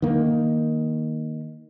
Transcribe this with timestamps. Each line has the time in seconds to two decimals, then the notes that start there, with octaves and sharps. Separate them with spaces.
0.02 D#3 A#3